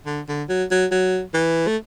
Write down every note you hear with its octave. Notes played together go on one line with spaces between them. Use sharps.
D3
D3
F#3
F#3
F#3
E3
A3